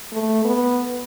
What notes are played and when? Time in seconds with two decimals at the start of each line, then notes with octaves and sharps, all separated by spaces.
0.13 A3
0.44 B3